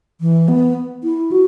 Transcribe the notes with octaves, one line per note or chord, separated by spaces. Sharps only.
E3
B3
E4
F#4